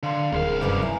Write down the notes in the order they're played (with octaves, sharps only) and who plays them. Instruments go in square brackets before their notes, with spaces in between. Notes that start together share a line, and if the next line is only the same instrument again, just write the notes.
[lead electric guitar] D3 [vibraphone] F5 C6
[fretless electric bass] D#1 [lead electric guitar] C2 F5 [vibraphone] G#4 A#4
[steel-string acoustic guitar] F#2 C#3 B4 [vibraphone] D6
[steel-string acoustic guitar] E4 [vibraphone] G#5 A#5